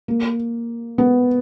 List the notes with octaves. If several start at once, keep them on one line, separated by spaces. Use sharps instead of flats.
A#3
B3